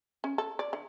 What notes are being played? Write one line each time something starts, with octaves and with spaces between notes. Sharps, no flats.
C#4
A4
D5
D3